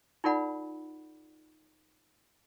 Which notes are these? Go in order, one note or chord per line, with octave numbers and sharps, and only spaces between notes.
D#4 F4 A4 D5 F#5 B5